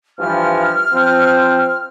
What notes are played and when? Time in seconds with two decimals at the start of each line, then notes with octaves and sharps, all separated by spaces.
0.19 G2 E3 F3 F6
0.92 F3 C4